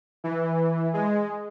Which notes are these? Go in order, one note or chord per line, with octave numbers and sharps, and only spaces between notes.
E3
G#3